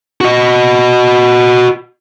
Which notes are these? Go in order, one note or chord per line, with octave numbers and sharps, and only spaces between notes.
F#4 D#5